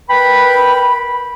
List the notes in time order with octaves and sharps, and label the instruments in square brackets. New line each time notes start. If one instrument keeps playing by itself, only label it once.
[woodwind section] A#4 B4 G5 B5